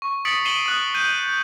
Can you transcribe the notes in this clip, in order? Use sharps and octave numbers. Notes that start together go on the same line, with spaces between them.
C#6
D#6 A6 B6 C#7 D7 F#7
C7 D#7 E7 F#7 G7
D#6 F#6 D7
G6 D#7